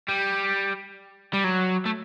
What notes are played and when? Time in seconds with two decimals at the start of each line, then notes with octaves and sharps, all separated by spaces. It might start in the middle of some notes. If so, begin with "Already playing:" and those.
0.08 G3
1.33 G3
1.44 F#3
1.86 A3